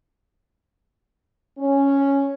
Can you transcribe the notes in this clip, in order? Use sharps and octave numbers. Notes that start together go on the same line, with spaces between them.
C#4